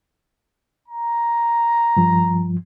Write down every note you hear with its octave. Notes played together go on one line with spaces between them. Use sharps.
A#5
G2 F3